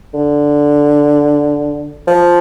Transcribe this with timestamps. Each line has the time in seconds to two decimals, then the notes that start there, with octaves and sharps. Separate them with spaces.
0.14 D3
2.07 F3